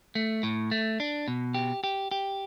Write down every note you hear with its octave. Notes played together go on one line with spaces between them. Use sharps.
A3
A2
A3
D4
B2
G4
G4
G4